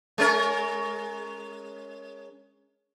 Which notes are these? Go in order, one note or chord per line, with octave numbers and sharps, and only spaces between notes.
G#3 C#4 A#4